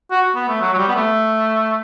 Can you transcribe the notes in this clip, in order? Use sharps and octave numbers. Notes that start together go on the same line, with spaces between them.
F#4
B3
A3
F#3
F#3
G3
B3
A3